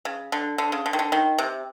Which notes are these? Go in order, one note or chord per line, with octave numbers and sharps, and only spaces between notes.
C#3
D3
D3
C#3
D3
D#3
D3
D#3
C3